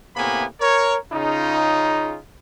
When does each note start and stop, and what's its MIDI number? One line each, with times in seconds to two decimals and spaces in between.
0.16 0.44 45
0.16 0.44 48
0.16 0.44 58
0.16 0.44 59
0.16 0.44 80
0.16 0.44 83
0.61 0.96 70
0.61 0.96 73
1.12 2.18 49
1.12 2.18 63
1.12 2.18 65